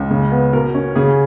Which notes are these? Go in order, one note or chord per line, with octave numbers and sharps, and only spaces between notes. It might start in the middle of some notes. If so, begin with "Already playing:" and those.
Already playing: C#2
C#3
B3
B2 A#4
C#4
C#3 G#4